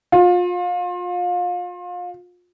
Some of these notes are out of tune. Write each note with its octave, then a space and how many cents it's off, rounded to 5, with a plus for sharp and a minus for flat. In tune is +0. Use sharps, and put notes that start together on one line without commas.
F4 +30